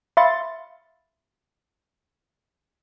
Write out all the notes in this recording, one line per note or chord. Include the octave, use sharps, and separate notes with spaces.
E5 F5 B5 C6 A6 C#7